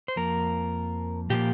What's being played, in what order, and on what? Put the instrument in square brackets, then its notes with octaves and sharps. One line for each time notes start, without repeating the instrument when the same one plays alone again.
[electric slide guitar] C5
F2 F3 A#3 A#4
A#2 F3 A#3 G4